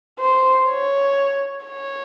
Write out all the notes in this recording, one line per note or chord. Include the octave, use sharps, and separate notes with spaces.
C5
C#5
C#5